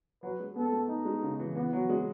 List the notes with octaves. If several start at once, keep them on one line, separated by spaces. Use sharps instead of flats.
F#3 B4
G#3
B3 A4
A3
D#4
G#3
C#3
E3
E3 B3
F#3
G#3